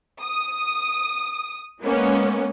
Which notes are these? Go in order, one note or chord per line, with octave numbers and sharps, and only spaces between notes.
D#6
G#3 A#3 B3 C#4